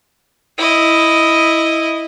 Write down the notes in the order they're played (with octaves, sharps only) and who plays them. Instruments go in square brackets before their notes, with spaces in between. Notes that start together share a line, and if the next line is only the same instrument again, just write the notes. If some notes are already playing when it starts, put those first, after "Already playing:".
[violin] E4 D#5